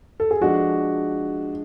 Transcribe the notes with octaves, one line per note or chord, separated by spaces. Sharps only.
A4
G#4
F3 G#3 D4 F#4